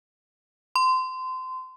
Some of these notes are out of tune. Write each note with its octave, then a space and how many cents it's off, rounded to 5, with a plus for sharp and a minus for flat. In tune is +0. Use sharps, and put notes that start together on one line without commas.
C6 -25